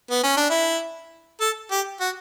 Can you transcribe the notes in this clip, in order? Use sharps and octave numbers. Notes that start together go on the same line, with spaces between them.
B3
C#4
D4
E4
A4
G4
F#4